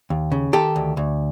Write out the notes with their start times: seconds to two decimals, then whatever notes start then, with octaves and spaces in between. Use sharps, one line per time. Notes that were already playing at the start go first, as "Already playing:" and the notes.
0.10 D#2
0.32 C#3
0.53 D#3 G4 A4
0.76 D2
0.97 D2